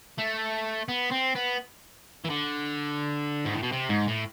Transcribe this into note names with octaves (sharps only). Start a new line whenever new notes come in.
A3
B3
C4
B3
E3
D3
G#2
A2
B2
C3
G#2
A2